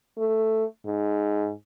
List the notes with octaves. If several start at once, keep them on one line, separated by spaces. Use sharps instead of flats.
A3
G#2